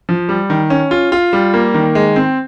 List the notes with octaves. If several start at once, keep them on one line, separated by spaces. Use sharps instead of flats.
F3
G3
D#3
C#4
F4
F4
G3
A#3
D#3
G#3
C4